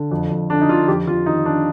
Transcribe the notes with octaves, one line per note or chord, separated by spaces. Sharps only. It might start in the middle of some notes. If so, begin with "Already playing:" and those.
Already playing: D3
F2
F2
D3 D4
D#4
D3 F4
F2 G4
F2 F4
D#3 D#4
D#3 D4